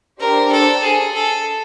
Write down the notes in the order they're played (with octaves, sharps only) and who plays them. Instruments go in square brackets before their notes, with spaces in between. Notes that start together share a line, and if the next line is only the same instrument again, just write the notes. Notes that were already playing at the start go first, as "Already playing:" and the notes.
[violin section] D4 G4 C5 [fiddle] A#4
[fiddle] A4
G#4
A4